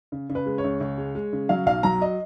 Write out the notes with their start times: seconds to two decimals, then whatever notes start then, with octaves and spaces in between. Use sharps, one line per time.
0.12 C#3
0.29 C#3
0.35 B4
0.46 G#3
0.58 C#5
0.64 C#2
0.81 C#2
0.98 G#3
1.15 G#3
1.33 C#3
1.49 F#3 F5
1.66 B1 F5
1.83 F#3 A#5
2.02 D#5